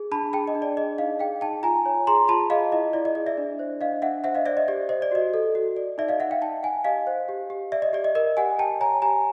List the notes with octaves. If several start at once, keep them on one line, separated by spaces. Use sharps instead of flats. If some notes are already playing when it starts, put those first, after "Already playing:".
Already playing: G#4
D4 A5 B5
G#4 G5 A5
D#5
D4
D5
G#4 D#5
D#4 D#5 F5
G#4 F5 G5
D#4 G5 A5
F4 G#5 A#5
C#5
G#4 A#5 C6
F4 A5 B5
G#4 D#5 F5
E4 D#5
E4 D5
D#5
G#4 D#5
D5 E5
D4
C5
D4 D#5 F5
D4 E5 F#5
C5 E5 F#5
D#5 F5
C5 D5 E5
D#5
G4 D5
C5 D#5
D5
F#4 D#5
A4
F#4
D5
D#4 D5 E5
D#5 F5
D#4 E5 F#5
F5 G5
D#4 G5 A5
D#4 F#5 G#5
G4 D#5 F5
C5
G4
G4
D5 E5
D#5
G4 D5
D#5
A#4 D#5
G4 F#5 G#5
G4 G5 A5
C#5 G#5 A#5
G4 G#5 A#5